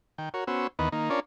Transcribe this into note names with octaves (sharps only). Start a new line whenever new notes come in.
D#3 G5
F#4 A#4 C#5
B3 C#4 F#4 C5 E6
D#2 D#3 E3 B3 B4 D#5
D#3 A#3 D#4
C#4 D4 F4 A#4 C#5 D5